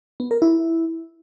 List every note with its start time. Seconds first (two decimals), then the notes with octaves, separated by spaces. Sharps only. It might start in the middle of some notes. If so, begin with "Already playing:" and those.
0.20 B3
0.31 A#4
0.42 E4